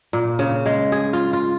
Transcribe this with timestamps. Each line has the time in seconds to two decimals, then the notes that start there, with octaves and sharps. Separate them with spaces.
0.13 A#2
0.39 C#3
0.66 G#3
0.92 G#4
1.13 F4
1.33 F4